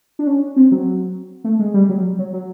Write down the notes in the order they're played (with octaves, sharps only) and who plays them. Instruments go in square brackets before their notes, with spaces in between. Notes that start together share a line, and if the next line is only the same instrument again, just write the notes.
[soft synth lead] D4
C#4
C4
F#3
A3
G#3
G3
F#3
F#3
F#3